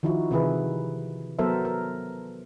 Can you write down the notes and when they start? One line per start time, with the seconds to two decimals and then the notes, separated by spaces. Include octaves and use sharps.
0.03 D#3 F3 D#4 E4 F#4
0.31 C3 D#3 E3 E4 G#4 B4
1.39 F#3 B3 A4 A#4 C5 E5
1.65 A#4